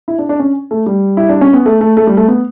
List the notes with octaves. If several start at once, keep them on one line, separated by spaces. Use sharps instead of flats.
E4
D4
D4
C#4
A3
G3
E4
D4
C#4
B3
A3
A3
A3
G3
A3
B3